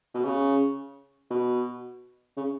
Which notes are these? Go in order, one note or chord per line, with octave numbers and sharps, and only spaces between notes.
B2
C#3
B2
C#3